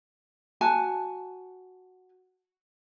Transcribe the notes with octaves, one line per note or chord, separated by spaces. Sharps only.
F#4 G#5 A5